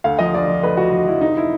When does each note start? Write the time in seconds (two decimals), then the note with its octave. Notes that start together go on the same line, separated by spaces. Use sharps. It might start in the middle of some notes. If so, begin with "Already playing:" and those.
0.04 D2 F5
0.19 F3 D#5
0.34 D2 D5
0.48 F3
0.63 D2 B4
0.77 F3 F#4
0.93 F3
1.08 F3 E4
1.21 F1 D#4
1.37 E4